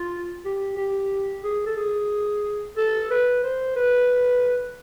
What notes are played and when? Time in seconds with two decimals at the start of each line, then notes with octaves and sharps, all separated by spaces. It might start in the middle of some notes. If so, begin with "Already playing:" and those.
Already playing: F4
0.45 G4
0.77 G4
1.44 G#4
1.66 A4
1.76 G#4
2.76 A4
3.10 B4
3.43 C5
3.75 B4